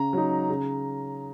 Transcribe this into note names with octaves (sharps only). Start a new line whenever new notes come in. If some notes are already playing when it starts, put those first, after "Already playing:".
Already playing: C#3 A#5
F#3 D#4
C#3